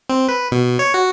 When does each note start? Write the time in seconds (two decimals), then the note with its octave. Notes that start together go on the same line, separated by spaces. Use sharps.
0.10 C4
0.29 B4
0.52 B2
0.79 C#5
0.94 F#4